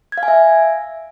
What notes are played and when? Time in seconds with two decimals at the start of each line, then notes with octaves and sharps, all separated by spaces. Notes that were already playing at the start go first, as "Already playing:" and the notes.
0.12 G#6
0.18 F5
0.23 G#5
0.28 E5